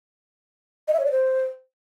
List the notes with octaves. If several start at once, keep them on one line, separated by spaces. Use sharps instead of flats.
D#5
E5
C#5
D5
C5